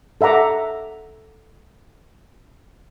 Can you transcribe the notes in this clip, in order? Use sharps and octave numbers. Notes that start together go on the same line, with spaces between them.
A4 E5 F#5 A#5 D6